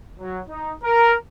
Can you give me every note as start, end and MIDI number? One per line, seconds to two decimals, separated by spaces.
0.19 0.40 54
0.48 0.73 63
0.83 1.14 70